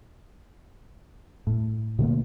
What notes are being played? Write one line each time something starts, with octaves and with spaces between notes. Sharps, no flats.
A2
B2 D3 A3 A#3